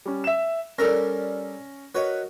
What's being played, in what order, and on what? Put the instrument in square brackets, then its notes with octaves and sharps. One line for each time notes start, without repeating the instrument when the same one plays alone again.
[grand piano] G3 C#4
E5 E7
[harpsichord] G3 A4 A#4 [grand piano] C#4 A#6
[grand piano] F#4 A#4 D#5 [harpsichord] B4 C#5